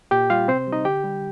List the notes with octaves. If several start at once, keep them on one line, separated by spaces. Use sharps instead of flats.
A#2 G4 G5
G3 F4 F5
C3 C4 C5
G3
D#4 D#5
D3 G4 G5
G3